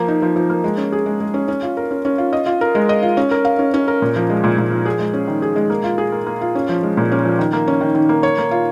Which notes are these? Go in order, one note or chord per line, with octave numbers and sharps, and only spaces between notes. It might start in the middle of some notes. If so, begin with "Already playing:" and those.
Already playing: F3 A#3
D#4
F3
F3
A#3
G#3
C#4
G#4
G#3
G#3
C#4
C#4
F4
A#4
C#4
C#4
F4
D#5
F4
A#4
G#3
D#5
F4
C#4
A#4
F5
C#4
C#4
A#4
A#2
F3
G#3
A#2
A#2
F3
G#4
G#3
C#4
D#3
G#4
G#3
A#3
F4
G#4
A#3
A#3
F4
C#4
F3
G#3
A#2
C#4
F3
D#3
A#3
C#4
D#3
D#3
A#3
C#5
A#3
F4